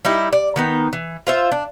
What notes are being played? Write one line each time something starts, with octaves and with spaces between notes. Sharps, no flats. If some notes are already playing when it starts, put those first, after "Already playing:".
G3 D#4 E4
D5
D#3 B3 D#4
E3
F4 C5 E5
D4